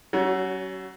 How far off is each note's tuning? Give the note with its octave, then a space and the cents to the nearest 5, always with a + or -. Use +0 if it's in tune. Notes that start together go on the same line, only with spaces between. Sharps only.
F#3 +40 C#4 +15 F#4 +0